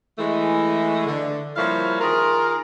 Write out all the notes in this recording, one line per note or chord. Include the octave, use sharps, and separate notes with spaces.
E3 G#3 A3
D3
F3 G3 A#3 E4 C#5 F5
D#3 F4 G#4 A#4